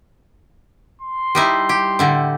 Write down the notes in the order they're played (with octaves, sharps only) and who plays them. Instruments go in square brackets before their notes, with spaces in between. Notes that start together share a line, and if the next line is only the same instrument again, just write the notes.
[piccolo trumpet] C6
[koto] G3 D#4 E4
G4
A2 D3 E4